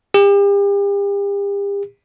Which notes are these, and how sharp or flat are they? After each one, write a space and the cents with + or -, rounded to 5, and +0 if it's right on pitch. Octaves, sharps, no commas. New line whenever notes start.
G4 +40